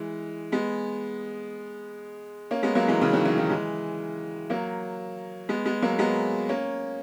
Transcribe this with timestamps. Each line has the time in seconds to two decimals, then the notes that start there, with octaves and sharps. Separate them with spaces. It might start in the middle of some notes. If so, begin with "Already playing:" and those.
Already playing: E3 G#3
0.52 G#3 B3
2.51 A#3 C#4
2.63 G#3 B3
2.75 F#3 A#3
2.88 E3 G#3
3.01 C#3 E3
3.13 D#3 F#3
3.25 D#3 F#3
3.38 D#3 F#3
3.50 E3 G#3
4.50 F#3 A#3
5.49 G#3 B3
5.66 G#3 B3
5.82 F#3 A#3
5.99 G#3 B3
6.49 A#3 C#4